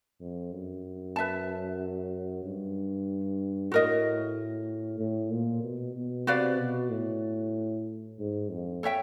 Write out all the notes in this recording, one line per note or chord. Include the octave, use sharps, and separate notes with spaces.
F2
F#2
B4 E5 A5
G2
A2 F#4 A#4 D#5
A2
A#2
B2
B2
C3 F#4 B4 D5 F5
B2
A2
G#2
F2
A4 C#5 E5 G5